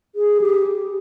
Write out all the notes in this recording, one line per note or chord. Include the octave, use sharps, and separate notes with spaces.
G#4
G4